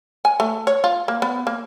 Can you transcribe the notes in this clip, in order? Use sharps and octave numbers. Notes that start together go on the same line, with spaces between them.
G#5
A3
C#5
F4
A#3
B3
A#3